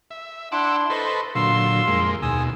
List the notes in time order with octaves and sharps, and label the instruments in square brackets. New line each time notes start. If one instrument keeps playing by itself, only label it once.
[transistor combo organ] E5
[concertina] D4 E4 [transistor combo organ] F#5 D6 E6 [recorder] C6
[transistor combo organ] A4 B4 C5 [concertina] D#5 C#6
[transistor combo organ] A#2 D3 F#3 [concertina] F5 E6 [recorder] C6
[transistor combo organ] F2 G#3 A#3
[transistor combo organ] D#2 B2 [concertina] G#5 D#6 E6